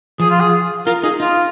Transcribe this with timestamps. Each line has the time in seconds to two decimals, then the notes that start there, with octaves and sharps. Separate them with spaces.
0.20 F3 G#4
0.30 F4
0.40 G#4
0.86 F4 A#4
1.03 D#4 G#4
1.20 D#4 F4